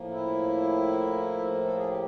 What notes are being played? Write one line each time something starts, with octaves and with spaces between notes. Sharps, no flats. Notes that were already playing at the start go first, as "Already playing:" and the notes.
Already playing: A2 F3 A#3
E4
A4
G#4
G4